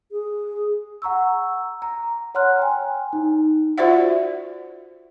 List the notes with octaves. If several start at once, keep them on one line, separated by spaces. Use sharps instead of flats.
G#4
F#5 A#5 C#6 E6
A#5
C#5 F#5 A#5 C6 F6 F#6
G5 G#5
D#4
F4 F#4 C5 D5 E5 F#5